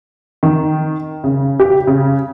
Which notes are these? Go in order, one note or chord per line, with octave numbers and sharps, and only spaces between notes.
D#3
C#3
G4
C#3